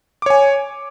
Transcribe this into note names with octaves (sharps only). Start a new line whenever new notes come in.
C#5 G#5 D6